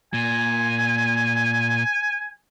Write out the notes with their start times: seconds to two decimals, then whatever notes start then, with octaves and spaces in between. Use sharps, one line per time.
0.14 A#2 G#5